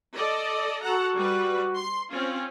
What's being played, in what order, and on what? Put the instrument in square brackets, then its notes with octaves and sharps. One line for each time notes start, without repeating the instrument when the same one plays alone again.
[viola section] A4 D5 D#5
[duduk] F#4 [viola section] A4 F#5 A#5
[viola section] G3 B4
C6
C4 C#4 F4